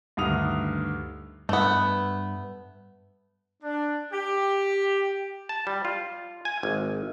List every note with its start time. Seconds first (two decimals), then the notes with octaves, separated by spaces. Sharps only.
0.17 D2 G2 D#3 D#6 F7
1.49 G2 A3 B3
3.63 D4
4.13 G4
5.49 A5
5.67 G3
5.85 F4
6.45 G#5
6.63 G#1